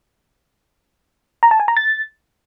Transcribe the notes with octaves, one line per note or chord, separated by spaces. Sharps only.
A#5
A5
G#5
A#5
A6